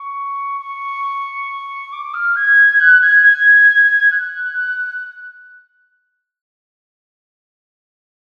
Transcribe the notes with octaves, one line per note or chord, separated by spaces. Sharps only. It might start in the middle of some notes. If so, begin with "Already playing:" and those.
Already playing: C#6
C#6
D6
F6
G#6
F#6
G#6
G#6
F#6